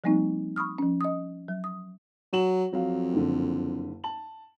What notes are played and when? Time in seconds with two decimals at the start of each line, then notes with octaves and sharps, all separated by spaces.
0.04 F3 G3 A#3 C4 D#4
0.56 B5 C#6 D#6 F6
0.78 F3 C#4
1.01 D#5 D#6
1.48 F#3
1.64 D#6
2.33 F#3 F#4 E7 F#7
2.73 F2 F#3 F5
3.13 F#1 D3
4.04 A5 F#7